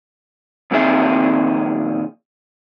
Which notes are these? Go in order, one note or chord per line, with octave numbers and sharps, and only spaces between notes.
F2 A#2 D#3 C4 G#4 E5